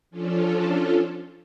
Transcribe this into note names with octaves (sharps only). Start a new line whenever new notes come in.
F3 C#4 D4 F4 A4